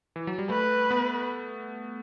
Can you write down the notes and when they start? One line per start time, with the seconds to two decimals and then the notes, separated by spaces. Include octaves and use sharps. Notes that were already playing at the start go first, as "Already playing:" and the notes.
0.16 E3
0.27 F#3
0.38 G3
0.50 A3 B4
0.91 B3